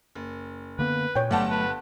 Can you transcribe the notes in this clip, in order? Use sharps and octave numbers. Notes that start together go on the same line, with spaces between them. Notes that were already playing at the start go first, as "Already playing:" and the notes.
F#1
D3 A#3 B3 B4
A#2 C#5 G5
G1 F#3 G3 A3 F#5 A5
B4